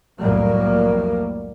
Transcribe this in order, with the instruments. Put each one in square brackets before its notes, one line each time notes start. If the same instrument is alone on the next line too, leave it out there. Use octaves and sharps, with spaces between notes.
[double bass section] C2 F2 A2 F#3 G3 A#3